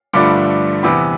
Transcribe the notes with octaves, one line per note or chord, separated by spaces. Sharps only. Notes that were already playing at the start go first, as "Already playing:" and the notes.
G2 D3 F3 A3 D4 B5 D6
E2 C3 E3 B3 B5 D6